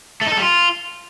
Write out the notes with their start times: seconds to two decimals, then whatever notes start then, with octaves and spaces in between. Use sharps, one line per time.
0.21 A3
0.27 D#4
0.32 A4
0.37 G3
0.42 F4